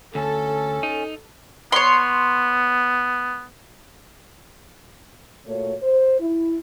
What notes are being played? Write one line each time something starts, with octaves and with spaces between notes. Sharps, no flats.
D2 C#4 A4
D#4
B3 C#5 C6
A#2 A3 F#4 C#5
C5
E4